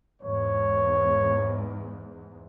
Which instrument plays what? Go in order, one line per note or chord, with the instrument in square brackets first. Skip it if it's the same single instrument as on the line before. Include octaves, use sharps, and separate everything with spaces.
[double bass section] E2 G#2 [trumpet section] C#5